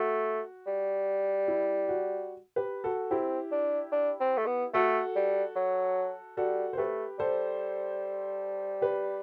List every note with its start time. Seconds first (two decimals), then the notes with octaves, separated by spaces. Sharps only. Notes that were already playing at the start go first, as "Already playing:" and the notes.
Already playing: A3 F#4
0.67 G3
1.48 E4
1.88 F#4
2.56 G4 B4
2.84 F#4 A4
3.11 C4 E4 G4
3.52 D4
3.92 D4
4.21 C4
4.38 A3
4.47 B3
4.74 A3 F#4 A4
5.16 G3
5.56 F#3
6.37 G3 F#4 A4
6.73 C5
6.78 A3 G4 B4
7.19 G3 A4 C5
8.82 G4 B4